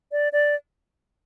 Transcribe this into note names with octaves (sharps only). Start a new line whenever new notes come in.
D5
D5